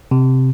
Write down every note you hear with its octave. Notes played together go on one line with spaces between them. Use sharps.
C3